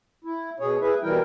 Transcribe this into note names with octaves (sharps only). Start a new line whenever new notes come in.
E4
B2 G#4 C#5
E4 G#4 B4 E5
B2 E3 G3 E4 A#4 G5